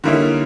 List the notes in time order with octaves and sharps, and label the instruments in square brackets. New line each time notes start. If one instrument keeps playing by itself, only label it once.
[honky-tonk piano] D3 G3 A#3 C#4 E4 [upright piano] D#4